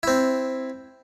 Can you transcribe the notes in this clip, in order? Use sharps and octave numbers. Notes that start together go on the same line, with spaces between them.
C4 E4